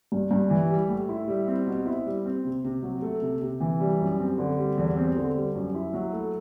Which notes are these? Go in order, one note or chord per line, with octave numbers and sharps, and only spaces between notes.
G2
G2
E3
G3
A2
E4
G3
C4
B2
E4
G3
C4
C3
C3
F#3
A3
C3
C3
E3
G3
F#2
C4
D3
G3
E2
C4
D3
G3
F#2
E4
F#3
A3